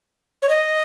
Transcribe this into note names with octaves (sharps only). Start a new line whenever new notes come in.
C#5
D#5